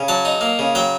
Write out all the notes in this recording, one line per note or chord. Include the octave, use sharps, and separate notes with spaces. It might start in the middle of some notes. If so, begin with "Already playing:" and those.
Already playing: C#3
F#3 A5
D#4
A#3
C#3
F#3 G5